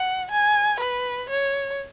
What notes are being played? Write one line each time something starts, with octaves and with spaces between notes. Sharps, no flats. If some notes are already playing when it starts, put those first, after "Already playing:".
Already playing: F#5
G#5
B4
C#5